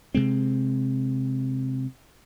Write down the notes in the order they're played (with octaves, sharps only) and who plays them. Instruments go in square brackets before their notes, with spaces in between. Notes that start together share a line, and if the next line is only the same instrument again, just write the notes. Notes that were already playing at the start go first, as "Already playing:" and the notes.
[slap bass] C3 G#3 C4